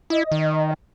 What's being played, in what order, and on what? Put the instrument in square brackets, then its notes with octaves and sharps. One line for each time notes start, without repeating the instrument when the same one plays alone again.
[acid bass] E4 [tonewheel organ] D#5
[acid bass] D#3